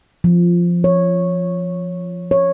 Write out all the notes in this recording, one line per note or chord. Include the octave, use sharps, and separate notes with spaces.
F3
C#5
C#5